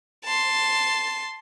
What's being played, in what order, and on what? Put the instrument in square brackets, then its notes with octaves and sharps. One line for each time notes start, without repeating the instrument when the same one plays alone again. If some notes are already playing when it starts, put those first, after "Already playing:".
[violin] A5 C6